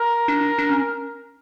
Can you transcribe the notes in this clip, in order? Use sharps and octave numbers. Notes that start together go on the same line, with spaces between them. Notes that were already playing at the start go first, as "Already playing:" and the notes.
Already playing: A#4
D4
D4
C#4